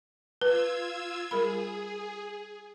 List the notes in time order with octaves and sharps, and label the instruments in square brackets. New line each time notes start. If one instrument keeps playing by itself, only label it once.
[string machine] F4 E6 G#6 [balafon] B4
[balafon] G3 A#4 B5 [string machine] G#4